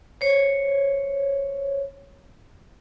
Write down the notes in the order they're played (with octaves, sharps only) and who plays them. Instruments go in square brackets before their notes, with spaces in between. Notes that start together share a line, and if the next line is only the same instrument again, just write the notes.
[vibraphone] C5 C#5